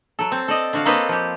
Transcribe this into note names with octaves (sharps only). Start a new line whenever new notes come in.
F#3 A4
C4
A4 D5 D#5
D3 F#4 F5
A#3 C4 A4 B4 C#5 D#5
F3 G4